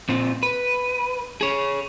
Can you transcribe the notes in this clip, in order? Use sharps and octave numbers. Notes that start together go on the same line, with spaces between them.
A#2 C4 F4
B4
G#4 C#5